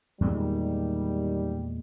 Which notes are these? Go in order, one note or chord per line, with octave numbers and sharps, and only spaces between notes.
E2 A#2 D#3 G3 G#3